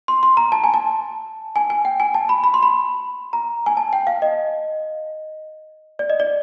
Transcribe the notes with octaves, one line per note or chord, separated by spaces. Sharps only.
C6
C6
A#5
A5
G#5
A5
G#5
G#5
G5
G#5
A5
B5
B5
C6
B5
A#5
G#5
A5
G5
F5
D#5
D5
D#5
D5